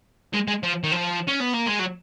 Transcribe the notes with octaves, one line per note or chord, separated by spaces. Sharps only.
G#3
G#3
F3
D#3
F3
C#4
B3
A#3
G#3
F#3